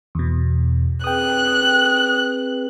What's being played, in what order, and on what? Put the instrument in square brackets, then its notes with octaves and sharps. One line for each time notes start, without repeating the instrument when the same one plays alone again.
[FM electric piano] E2 B2
[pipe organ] C4 G#4 B4 [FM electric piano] G5 D#6 [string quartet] F#6